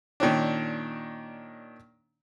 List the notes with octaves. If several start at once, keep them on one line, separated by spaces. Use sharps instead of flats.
A#2 D#3 C#4 D4